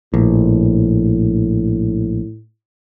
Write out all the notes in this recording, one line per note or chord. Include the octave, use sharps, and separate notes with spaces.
A#1 A2